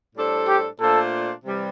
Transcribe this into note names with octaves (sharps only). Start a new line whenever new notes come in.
A2 G3 D4 A4 C5
G4
A#2 A3 D4 F4 A4 C5
C3 E3 G3